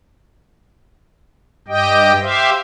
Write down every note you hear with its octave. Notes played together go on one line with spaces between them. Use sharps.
G2 G4 D#5 G5
G4 C5 E5 F5